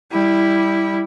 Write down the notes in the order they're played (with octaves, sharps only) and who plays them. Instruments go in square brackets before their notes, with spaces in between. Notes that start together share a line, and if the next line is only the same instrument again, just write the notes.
[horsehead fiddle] G3 E4